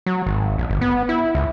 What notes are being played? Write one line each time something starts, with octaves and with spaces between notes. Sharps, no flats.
F#3
G#1
A#1
G1
B3
E4
C#2